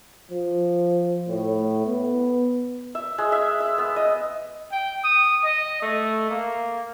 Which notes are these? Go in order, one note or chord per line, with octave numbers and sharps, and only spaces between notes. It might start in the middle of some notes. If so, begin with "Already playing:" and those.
F3
A2
B3
E5
G#3
E5
E5
B3
D#5
G5
D#6
D#5
A3
A#3